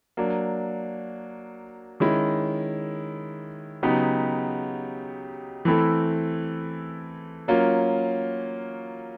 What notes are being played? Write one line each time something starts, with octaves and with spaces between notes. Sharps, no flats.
F#3 A#3 D4
D#3 G#3 C#4 E4
C#3 F#3 B3 D#4 G4
E3 A3 C4 E4 A4
F#3 A#3 C#4 F4